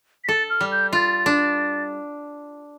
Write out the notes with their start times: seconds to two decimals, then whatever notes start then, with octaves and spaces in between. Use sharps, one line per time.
0.24 B6
0.28 A4 A6
0.50 F6
0.61 G3
0.72 G6
0.93 F4 A6
1.26 D4